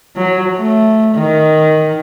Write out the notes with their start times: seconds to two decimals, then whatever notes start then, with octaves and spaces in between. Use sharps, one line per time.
0.16 F#3
0.56 A3
1.16 D#3